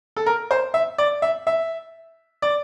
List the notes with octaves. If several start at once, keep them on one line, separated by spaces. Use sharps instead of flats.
A4
A#4
C5
E5
D5
E5
E5
D5